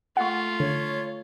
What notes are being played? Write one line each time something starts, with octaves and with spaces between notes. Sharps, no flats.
A3 F4 F#5 C#6
D3 C#5